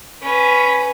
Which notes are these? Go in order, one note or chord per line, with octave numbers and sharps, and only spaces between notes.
C#4 B4